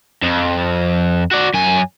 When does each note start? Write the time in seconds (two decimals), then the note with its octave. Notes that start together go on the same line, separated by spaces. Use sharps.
0.22 F2
1.31 F#4 D5
1.54 F#2 G#5